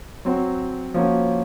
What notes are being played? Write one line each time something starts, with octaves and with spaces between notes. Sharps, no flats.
F#3 C4 F#4
F3 A#3 C#4 F#4